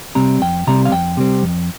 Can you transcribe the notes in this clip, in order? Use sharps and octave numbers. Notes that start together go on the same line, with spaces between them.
C3 G3 C4 A#5
F2 G5
C3 G3 C4 A#5
F5
F2 G5
C3 G3 C4
F2